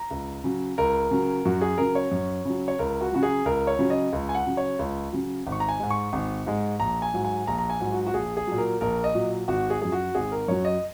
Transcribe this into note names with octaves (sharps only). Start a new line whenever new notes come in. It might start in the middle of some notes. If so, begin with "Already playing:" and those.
Already playing: A#5
C#2
C#3 F#3
C#2 A#4
C#3 F#3
F#2 F#4
G#4
C#3 F#3 A#4
C#5
F#2
C#3 F#3
C#5
C#2 A#4
F#4
C#3 F#3 F#4
G#4
C#2 A#4
C#5
C#3 F#3
D#5
C#2
G#5
F#5
C#3 F#3
C#5
C#2
C#3 F#3
G#1
C#6
A#5
G#5
G#2 G#3
C#6
G#1
G#2 G#3
A#1 A#5
G#5
G#2 F#3
G#5
A#1 A#5
A#5
G#5
G#2 F#3
F#4
F#4
A#1 G#4
G#4
A#2 F#3
A#4
A#1 A#4
D#5
A#2 F#3
G#1 F#4
G#4
F#2 F#3 G#4
F#4
G#1 G#4
A#4
F#2 F#3 C#5
D#5